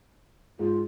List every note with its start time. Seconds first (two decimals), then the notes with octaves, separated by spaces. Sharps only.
0.59 G#2 F4